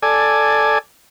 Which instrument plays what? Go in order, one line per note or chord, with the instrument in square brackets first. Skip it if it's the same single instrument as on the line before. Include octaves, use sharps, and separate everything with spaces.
[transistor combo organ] A4 D5 G#5